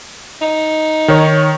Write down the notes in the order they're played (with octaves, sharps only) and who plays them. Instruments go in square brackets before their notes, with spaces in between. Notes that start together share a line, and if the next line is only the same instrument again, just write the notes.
[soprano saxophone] D#4
[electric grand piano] D#3 C#5